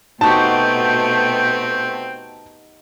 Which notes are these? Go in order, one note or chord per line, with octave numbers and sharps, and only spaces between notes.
B2 A3 C4 D#4 F#4 G4 G5 A5